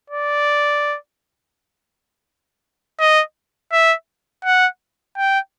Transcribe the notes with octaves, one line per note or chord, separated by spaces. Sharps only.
D5
D#5
E5
F#5
G5